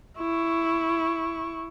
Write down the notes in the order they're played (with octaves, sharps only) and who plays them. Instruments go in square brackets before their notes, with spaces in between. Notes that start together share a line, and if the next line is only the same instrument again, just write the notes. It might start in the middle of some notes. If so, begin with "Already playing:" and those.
[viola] E4 C#6